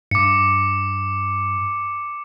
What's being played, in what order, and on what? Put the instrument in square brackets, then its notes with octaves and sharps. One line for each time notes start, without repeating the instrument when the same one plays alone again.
[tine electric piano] G2 [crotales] D6 C#7